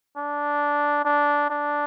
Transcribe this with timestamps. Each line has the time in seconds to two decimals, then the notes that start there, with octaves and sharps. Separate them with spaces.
0.17 D4
1.05 D4
1.50 D4